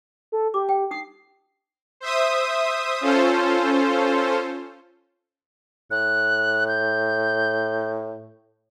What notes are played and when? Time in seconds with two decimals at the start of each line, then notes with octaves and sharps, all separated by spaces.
0.32 A4
0.54 G4 D6
0.69 G5
0.91 D#4 D#6 C7
2.00 C5 E5 D#6
3.01 C#4 F4 A4 C5
5.91 A2 F#6
6.68 G6